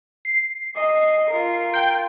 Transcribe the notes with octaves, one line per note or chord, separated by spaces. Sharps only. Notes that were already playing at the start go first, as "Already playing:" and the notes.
C7
D#5
F4 A#4
G5